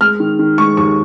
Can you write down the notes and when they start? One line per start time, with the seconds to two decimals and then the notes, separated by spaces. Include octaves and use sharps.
0.01 G#3 F6
0.20 D#3
0.39 D#3
0.58 G#3 C#6
0.77 D#2 C#6